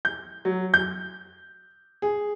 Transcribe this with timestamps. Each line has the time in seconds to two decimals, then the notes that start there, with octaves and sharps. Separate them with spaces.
0.05 G6
0.45 F#3
0.74 G6
2.02 G#4